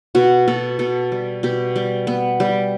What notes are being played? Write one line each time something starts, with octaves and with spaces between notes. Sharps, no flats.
B2 F#4
B2 A4
B2 A4
G3
B2 G4
G3
B3
G3